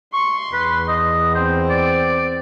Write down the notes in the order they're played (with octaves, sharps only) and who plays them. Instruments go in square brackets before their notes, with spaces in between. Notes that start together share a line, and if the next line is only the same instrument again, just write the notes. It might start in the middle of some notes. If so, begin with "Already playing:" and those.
[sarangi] C6 [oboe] C#6
[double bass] E2 [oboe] B4
[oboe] D#5
[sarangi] C4 [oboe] C5
[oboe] D5